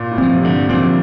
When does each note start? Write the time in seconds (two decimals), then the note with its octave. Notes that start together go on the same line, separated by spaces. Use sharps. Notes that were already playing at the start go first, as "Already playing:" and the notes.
Already playing: A#2
0.11 A2
0.18 A#2 F3 C4
0.33 C3
0.44 G2 D3
0.69 A#2 F3 C4